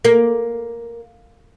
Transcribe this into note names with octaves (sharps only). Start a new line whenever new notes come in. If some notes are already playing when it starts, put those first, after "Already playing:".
A#3